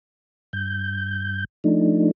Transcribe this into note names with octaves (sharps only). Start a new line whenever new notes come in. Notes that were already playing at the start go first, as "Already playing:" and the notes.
G2 G6
F3 A3 D4 D#4